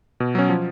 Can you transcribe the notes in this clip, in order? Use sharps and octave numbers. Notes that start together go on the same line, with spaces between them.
B2
F#3 C#4
F3